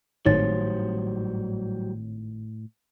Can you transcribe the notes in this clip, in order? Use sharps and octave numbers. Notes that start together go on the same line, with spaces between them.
G#1 A2 F#3 G3 D#4 C5 C#5 A6